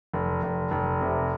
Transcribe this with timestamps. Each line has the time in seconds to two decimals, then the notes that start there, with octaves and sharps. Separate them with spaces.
0.13 F1
0.43 F1
0.71 F1
1.01 C3